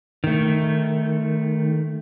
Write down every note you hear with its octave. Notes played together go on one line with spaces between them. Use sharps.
D#3 A3